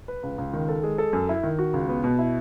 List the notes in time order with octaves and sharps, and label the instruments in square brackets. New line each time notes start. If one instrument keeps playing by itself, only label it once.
[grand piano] B4
C#2
C#2
D#3
A4
G#3
A4
F#2
E4
D#3
F#4
C#2
B3
B2
E4